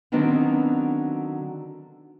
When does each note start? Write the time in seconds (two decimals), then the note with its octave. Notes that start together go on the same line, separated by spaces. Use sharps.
0.12 D3 D#3 F#3 B3 C4 D4